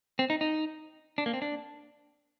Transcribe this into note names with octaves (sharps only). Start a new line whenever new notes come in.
C4
D#4
D#4
D4
A#3
C4
D4